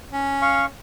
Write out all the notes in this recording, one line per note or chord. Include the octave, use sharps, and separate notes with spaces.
C#4
F5 C#6